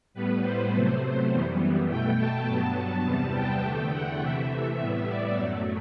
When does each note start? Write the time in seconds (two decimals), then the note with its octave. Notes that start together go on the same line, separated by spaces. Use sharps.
0.14 A2 G3 B3 B4
0.43 C5
0.72 C3 F#3 A3
1.30 F#2 E3 G3 B3
1.88 B2 A3 G5
2.17 A5
2.46 G2 F#3 B3 A5
3.03 E2 C3 G3 B3
3.32 G5
3.62 E2 D3 A3
3.91 F#5
4.19 C3 E3 A3 E5
4.77 A2 G3 B3
5.06 D5
5.36 F#2 F#3 A3